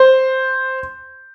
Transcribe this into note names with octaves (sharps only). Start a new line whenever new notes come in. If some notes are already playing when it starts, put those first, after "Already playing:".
Already playing: C5